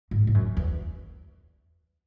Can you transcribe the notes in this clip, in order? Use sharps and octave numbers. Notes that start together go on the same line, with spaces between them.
G#2
G#2
F#2
E2